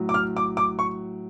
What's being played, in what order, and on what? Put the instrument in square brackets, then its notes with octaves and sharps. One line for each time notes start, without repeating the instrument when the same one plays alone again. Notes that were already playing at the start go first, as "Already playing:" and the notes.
Already playing: [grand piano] A2 F#3
D6
F6
D6
D6
C#6